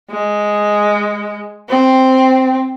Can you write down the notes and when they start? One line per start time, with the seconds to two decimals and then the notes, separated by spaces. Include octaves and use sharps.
0.11 G#3
1.69 C4